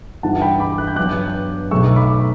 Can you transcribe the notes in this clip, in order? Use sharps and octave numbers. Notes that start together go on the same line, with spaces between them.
G2 E3 G3 F#5 A5
G5 B5
B5 D6
F#6
G6
G2 F#3 B3 D6 F#6
B1 B2 F#3 A3 C#6 E6
B5 D6